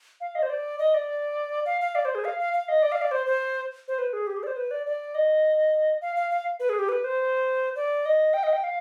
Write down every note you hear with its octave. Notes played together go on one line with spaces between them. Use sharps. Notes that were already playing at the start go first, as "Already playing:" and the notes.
F5
D#5
C5
D5
D#5
D5
F5
F5
D5
C5
G#4
F5
F5
F5
D#5
D5
F5
D5
C5
C5
C5
B4
G#4
G4
G#4
D5
C5
B4
D5
D5
D#5
F5
F5
F5
B4
G#4
G4
B4
C5
D5
D#5
G5
D#5
G5
F5